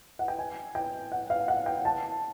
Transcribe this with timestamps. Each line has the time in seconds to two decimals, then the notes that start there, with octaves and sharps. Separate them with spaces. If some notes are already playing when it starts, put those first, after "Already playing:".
0.19 F#5
0.28 G5
0.39 G#5
0.75 G5
1.12 F#5
1.30 F5
1.48 F#5
1.66 G5
1.85 A5